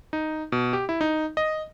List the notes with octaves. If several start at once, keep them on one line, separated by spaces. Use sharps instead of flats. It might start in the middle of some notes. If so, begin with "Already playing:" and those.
D#4
B2
G4
E4
D#4
D#5